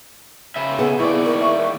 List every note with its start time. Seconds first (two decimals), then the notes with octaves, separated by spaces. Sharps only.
0.56 C#3 E5 B5
0.79 B3 G#4 A4 F#5 G#5
0.99 D#2 E4 D5 C#6
1.26 A#4
1.40 E5